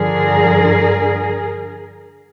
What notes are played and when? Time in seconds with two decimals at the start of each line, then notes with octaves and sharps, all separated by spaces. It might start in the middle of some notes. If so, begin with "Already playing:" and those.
Already playing: G2 D3 F3 G#4 A#4